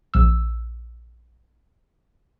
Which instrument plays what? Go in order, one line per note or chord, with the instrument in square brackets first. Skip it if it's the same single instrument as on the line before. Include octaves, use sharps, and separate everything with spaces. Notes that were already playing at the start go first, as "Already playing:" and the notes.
[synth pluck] A#1 E6